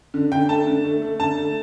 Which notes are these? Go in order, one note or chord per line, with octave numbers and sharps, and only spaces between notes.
D3
D3 G5
A3 A5
D3
A3
A3
D3 A5
A3